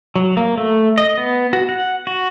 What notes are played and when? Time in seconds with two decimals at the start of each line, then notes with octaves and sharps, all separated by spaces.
0.16 F#3
0.37 A#3
0.58 A3
0.98 D#5
1.17 B3
1.53 F#4
1.69 F#5
2.07 F#4